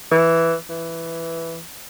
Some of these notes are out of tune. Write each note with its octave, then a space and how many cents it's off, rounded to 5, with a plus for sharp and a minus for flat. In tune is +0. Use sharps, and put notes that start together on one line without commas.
E3 +5
E3 +5